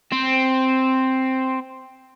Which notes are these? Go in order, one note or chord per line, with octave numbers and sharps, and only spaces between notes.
C4